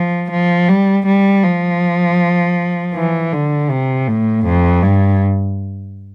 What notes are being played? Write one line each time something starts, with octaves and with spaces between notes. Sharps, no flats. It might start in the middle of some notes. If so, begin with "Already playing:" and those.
Already playing: F3
F3
G3
G3
F3
E3
D3
C3
A2
F2
G2